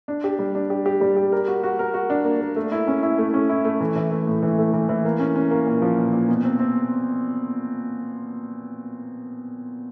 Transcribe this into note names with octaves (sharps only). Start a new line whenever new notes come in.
D4
G4
G3
D4
G4
G4
G3
G4
A#4
F#4
F#4
A#4
F#4
D4
A#3
A#3
A3
E4
C#4
E4
A3
C#4
E4
A3
E3
E3
A3
A2
E3
A3
E3
E3
A#3
C#4
C#4
A#3
A#2
F3
A#2
A#2
B2
C4
C4